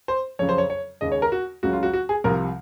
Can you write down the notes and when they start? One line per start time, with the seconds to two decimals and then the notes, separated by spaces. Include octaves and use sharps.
0.08 C5
0.39 F2 C#3 F#3 C#5
0.49 C5
0.58 C#5
0.70 C#5
1.01 D#2 C#3 G#3 D#5
1.12 C#5
1.22 A#4
1.32 F#4
1.63 C#2 C#3 F#3 F#4
1.73 F4
1.83 F#4
1.93 F#4
2.09 G#4
2.24 C2 C3 F3 A#4